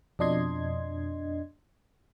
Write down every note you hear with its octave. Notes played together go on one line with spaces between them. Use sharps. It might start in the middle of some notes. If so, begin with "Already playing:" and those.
F2 B2 D4 D#5 C6 G#6